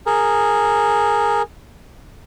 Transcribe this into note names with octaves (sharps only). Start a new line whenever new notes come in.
G#4 A#4